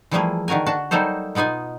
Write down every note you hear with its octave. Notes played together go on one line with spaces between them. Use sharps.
E3 F3 G3 A3 A#3 G#4
D3 D#3 F#4 A#4 G#5
D4 F#4 A5
F#3 G3 A#3 D#4 A4 C5
B2 B3 D#4 F4 G#5